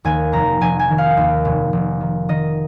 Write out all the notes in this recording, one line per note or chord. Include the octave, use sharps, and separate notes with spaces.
D#2 G#5
F1 A#5
F1 G#5
G#5
D#3
F5
D#2
F1
F1
D#3
D#3 D#5